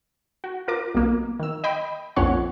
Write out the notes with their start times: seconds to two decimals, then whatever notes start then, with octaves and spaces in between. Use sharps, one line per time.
0.44 F#4
0.68 F4 A#4 D6
0.95 B1 A#3
1.39 D#3 E6
1.64 D#5 G5 B5
2.16 A#1 F2 C#4 C#5 F#5 C6